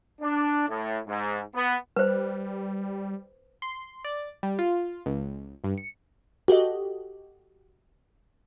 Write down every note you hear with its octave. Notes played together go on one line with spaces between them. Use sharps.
D4
A2
G#2
B3
G3 B4 C5
C6
D5
G3
F4
C#2
G2
C#7
F#4 G4 A4 D#5